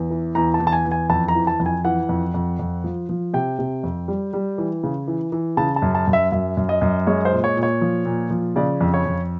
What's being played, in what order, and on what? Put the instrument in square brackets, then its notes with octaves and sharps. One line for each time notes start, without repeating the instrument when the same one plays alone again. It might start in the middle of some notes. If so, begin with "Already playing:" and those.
Already playing: [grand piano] E2
E3
E2 A#5
A5
E2
A5
G#5
E2
G#5
F2 A5
A#5
E3
A5
F2
G#5
E3 F#5
F2
F2
F2
F3
F3
C3 G5
C3
F2
G3
G3
E3
C#3
E3
E3
C#3 A5
A5
F#2
A5
F#2
E5
F#2 E5
F#2
D#5
F#2
G#3 C#5
C5
A#2
C#5
A#2
C#5
F3
A#2
F3
C#3 D5
F2
C#5
F2